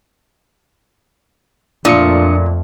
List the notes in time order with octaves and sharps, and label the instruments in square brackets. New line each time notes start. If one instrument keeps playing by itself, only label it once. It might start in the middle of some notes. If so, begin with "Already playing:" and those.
[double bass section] F2 [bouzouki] A#2 [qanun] A3 F4 [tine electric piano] D4 D#6 C#7